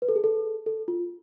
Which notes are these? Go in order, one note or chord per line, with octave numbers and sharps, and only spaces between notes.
B4
A4
G#4
A4
A4
F4